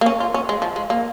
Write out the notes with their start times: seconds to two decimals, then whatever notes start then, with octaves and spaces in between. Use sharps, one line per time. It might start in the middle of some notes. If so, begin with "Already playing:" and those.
0.01 A#3
0.06 C#4
0.20 F4
0.34 C#4
0.49 G#3
0.62 F3
0.76 G#3
0.90 A#3